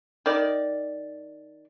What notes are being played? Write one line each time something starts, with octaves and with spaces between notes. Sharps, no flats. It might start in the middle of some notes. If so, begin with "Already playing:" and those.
D#3 D5